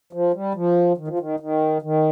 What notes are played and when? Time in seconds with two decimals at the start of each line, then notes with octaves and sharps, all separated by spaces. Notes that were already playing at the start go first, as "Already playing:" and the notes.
0.13 F3
0.34 G3
0.54 F3
0.98 D#3
1.08 F3
1.19 D#3
1.40 D#3
1.82 D#3